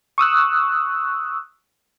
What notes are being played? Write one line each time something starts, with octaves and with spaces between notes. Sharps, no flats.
C#6 D#6 E6 F#6